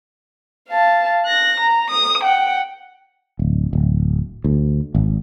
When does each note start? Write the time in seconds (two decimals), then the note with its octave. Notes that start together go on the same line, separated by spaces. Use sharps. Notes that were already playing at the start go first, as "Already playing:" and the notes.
0.69 F5 A5
1.26 F#6 A#6
1.60 A#5
1.90 D#6
2.24 F#5 G5
3.39 D1
3.73 D1
4.44 D2
4.95 G#1